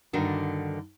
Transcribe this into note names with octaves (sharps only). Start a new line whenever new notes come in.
G2 D3 D#3 D4 F#4